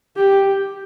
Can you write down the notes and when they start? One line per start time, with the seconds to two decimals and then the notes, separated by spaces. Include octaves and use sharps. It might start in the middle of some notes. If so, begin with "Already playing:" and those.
0.17 G4